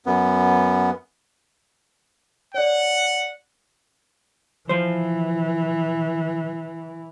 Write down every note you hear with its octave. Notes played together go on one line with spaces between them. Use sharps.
F#2 B3
C#5 D5 F#5
E3 F3 C5